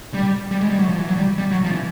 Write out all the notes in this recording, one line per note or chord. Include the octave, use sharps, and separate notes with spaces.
G3
G3
G#3
G3
F#3
F3
E3
F#3
G3
G3
F#3
F3
E3